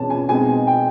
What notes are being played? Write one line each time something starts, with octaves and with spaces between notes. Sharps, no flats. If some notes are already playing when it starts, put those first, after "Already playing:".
Already playing: E2 B2 G#3 C#4 A5
G#5
B2 G#3 C4 D#4 G#5
G5